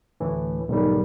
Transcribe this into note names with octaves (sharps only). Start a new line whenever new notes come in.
D2 A2 E3
B1 G#2 D#3 G3